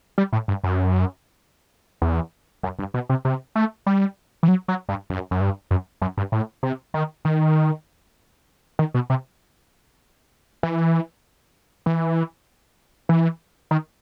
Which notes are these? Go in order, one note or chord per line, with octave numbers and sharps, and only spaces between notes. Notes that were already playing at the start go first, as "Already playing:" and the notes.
G3
A2
G2
F#2
E2
F#2
G2
B2
C3
C3
A3
G3
E3
F#3
F#3
G2
F#2
F#2
G2
F#2
F#2
G2
A2
C3
D#3
D#3
D#3
B2
C3
E3
E3
E3
D#3